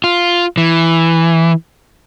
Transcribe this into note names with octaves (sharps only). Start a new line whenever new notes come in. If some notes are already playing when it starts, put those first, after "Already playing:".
F4
E3